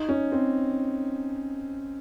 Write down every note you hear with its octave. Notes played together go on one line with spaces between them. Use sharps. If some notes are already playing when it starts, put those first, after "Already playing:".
Already playing: D#4
C#4
C4